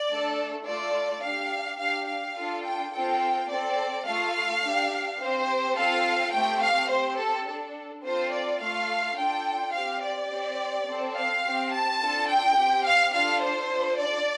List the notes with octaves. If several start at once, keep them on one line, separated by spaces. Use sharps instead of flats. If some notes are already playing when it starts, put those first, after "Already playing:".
Already playing: D5
A3 D4 A4
A3 F4 A4 D5
D4 G4 F5
D4 G4 F5
F5
D4 F4 A4
G5
C4 F4 A4 G5
C4 A4 D5
A3 F4 A4 F5
D4 G4
C4 G4 C5
C4 F4 A4 F5
A3 C4 G4 G5
F5
C4 G4 C5
A4
D4 A4
C4 F4 A4 C5
D5
A3 F4 A4 F5
D4 F4 A4 G5
C4 G4 F5
D5
C4 G4
C4 A4
F5
C4 G4
A5
D4 F4 A4
G5
C4 G4
F5
D4 F4 A4 F5
C5
D4 F4 A4
D5